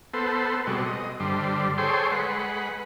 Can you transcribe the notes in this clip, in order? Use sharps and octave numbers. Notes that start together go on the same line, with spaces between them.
B3 A4 C5
B2 G3 G#3 C4 F#4
D#5
G2 D3 G3 C5
G#4 A4 C5 C#5 G5 C6
G#3 B4 F#5